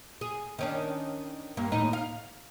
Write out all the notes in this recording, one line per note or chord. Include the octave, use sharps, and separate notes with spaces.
G#4
D#3 C#4 D4
G2 A#3
D#2 A2 D#4
F5